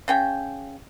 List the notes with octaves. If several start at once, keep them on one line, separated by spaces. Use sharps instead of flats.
C#3 C#4 G5